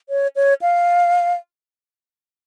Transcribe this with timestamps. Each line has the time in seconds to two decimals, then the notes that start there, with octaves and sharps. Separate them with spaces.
0.09 C#5
0.36 C#5
0.62 F5